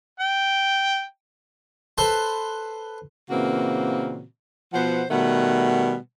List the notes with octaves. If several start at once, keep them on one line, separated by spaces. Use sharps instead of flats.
G5
A4 B4 C5 C6
A#2 C#3 E3 A#3 C4 F#4
B2 F3 B3 C5 F#5
B2 D#3 G3 A3 F#5